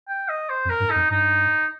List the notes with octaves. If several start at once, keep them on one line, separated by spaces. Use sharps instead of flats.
G5
D#5
C5
F2
A#4
G2
D#4
F2
G2 D#4